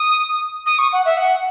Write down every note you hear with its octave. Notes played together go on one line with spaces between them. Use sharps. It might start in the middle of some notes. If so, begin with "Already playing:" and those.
Already playing: D#6
D#6
C#6
F#5
E5
F#5